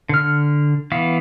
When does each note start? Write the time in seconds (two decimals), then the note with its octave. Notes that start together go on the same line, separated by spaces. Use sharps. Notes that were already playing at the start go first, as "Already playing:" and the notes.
0.09 D3 F6
0.92 E3 B3 F5